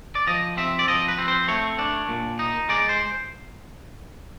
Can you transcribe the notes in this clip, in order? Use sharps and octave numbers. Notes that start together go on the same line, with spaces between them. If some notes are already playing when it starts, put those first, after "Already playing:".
D5
F3 D#5
C4 E5
D5
F3 D#5
B4
C4
C5
A3 C#5
D4
A#2
D#4
G#3 D5
C5